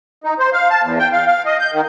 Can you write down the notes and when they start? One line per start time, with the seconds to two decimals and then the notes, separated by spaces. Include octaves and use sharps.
0.24 D#4
0.39 C5
0.53 F5
0.70 A5
0.83 E2
0.99 G5
1.12 F5
1.27 F5
1.46 D#5
1.59 G6
1.72 D#3